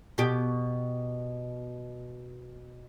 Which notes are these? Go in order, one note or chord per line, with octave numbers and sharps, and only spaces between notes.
B2 G4